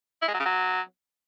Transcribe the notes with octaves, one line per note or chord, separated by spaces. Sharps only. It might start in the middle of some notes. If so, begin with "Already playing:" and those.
E4
G#3
F#3
C#3
F#3